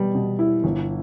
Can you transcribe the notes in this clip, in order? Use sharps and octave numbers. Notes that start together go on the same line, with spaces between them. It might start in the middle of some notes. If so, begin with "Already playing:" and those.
Already playing: B2 G3 B3
B2
E4
G1